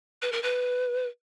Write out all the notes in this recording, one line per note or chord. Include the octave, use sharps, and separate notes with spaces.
B4
A#4
B4